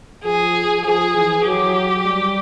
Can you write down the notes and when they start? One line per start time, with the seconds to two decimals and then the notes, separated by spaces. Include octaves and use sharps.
0.24 F3 G#4
0.85 F3 G#4
1.15 E3
1.46 F#3 G4
2.06 G3